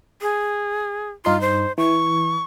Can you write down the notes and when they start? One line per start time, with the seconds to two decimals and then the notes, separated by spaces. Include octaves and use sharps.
0.22 G#4
1.25 G2 D#4 F4 C6
1.41 C5
1.78 E3 C#6